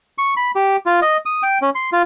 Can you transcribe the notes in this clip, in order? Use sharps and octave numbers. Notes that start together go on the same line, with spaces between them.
C#6
B5
G4
F4
D#5
D#6
G5
C#4
C6
F4